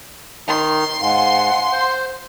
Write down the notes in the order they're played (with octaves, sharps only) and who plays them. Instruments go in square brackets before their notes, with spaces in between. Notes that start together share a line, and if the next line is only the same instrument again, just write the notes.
[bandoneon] D#3 D#4 [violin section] C6
[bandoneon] G#2 [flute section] F5 F#5 G#5
[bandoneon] C5